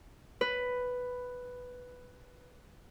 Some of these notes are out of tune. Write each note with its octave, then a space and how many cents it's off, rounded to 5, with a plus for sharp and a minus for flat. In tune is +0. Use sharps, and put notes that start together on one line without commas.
B4 +5